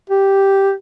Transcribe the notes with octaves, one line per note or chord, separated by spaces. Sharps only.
G4